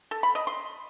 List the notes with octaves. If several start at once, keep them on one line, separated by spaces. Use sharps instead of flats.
A4
B5
D#5
C6